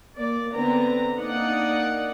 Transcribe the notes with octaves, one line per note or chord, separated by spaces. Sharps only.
A#3 D5
D3 B3 C4 A#5
A#3 D4 D#4 D5 F#5